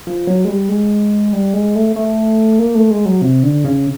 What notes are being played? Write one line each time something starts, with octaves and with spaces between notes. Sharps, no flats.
F3
F#3
G#3
G3
G#3
G3
G#3
A3
A3
A#3
A3
G#3
F#3
C3
D3
C#3